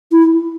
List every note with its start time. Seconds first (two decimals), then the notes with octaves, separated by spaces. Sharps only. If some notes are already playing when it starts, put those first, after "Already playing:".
0.12 E4